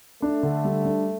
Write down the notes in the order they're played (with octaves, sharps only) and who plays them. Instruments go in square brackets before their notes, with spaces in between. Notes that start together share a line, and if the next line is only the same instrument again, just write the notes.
[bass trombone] A3 [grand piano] D4
[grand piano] D3
G3
D4